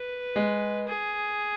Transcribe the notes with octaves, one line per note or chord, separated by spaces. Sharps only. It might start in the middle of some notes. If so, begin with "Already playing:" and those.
Already playing: B4
G#3
G#4